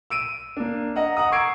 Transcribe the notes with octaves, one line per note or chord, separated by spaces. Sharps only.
E6 D7 D#7
A#3 D4
D#5 F#5 A#5
F#5 A#5 D#6
C#6 D6 E6 G#6 C7 D7